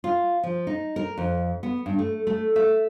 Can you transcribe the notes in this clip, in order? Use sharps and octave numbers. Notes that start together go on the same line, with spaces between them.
F4
F3
D#4
A#4
F2
B3
G2
A3
A3
E5